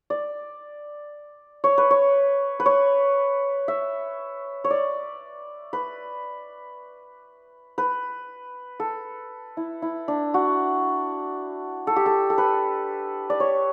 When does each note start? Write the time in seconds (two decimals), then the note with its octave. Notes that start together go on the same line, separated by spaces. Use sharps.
0.10 D5
1.64 C#5
1.78 B4
1.91 C#5
2.60 B4
2.66 C#5
3.68 E5
4.64 C#5
4.70 D5
5.73 B4
7.78 B4
8.80 A4
9.57 E4
9.82 E4
10.08 D4
10.34 F#4
11.87 A4
11.96 G4
12.06 A4
12.30 A4
12.38 B4
13.30 D5
13.40 C#5